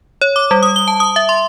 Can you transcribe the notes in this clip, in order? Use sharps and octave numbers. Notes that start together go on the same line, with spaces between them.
C#5
D6
G3
D#6
G7
A5
D#6
E5
C6